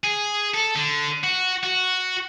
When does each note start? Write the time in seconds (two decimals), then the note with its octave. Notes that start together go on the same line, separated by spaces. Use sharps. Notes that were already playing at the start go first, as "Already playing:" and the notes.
0.04 G#4
0.54 A4
0.76 D3
1.23 F#4
1.63 F#4